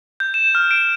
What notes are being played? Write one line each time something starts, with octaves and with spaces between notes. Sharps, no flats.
G6
E7
F6
D7